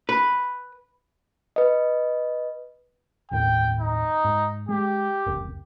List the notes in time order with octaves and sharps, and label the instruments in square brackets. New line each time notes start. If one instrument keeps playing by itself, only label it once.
[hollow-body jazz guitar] B4
[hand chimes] B4 D#5
[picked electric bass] G1 D#2 A2 [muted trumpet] G5
[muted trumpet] D#4
[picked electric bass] G#2
[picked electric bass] G#3 [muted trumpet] G4
[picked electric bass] F1 C#2